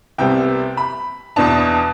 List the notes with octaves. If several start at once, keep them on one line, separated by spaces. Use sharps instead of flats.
C2 C3 G3 B3 G5
B5
E2 B2 B3 D4 A5